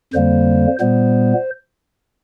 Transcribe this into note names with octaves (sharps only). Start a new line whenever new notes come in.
F2 D3 G3 A#3 C5
A#2 G3 B3 C5